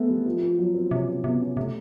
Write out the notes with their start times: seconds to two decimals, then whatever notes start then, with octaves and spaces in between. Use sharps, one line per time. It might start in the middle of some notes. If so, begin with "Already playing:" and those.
Already playing: G#3 A3 B3 C4
0.09 G3
0.26 F3
0.41 F3
0.58 F#3
0.74 C4
0.91 C3 C#4
1.07 C4
1.24 C3 B3
1.41 C#4
1.56 C3 A3